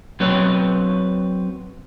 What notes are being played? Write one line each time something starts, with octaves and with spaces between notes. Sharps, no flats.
F#3 C4 B4 C#5